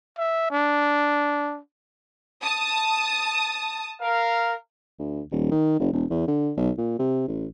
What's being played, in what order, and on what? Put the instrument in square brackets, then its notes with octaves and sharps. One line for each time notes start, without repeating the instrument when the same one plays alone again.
[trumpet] E5
D4
[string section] A5 D#6
[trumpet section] A#4 F5
[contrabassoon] D2
D#1
D#3
F#1
E1
E2
D3
B1
A#2
C3
A1